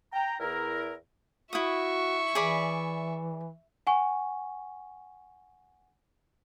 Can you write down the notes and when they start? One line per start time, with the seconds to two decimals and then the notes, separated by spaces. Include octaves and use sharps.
0.13 G5 A#5
0.40 E2 E4 A#4
1.53 E4 F#4 E5 C#6 D#6
2.35 E3 G#4 D5 B5
3.87 F#5 G#5 C#6